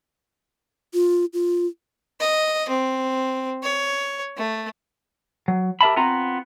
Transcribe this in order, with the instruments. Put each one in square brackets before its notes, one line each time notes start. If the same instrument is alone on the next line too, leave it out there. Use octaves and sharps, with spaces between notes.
[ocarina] F4
F4
[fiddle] D#5
C4
C#5
A3
[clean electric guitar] F#3
G4 A#4 E5 A5 B5
B3 C4 F4 A#5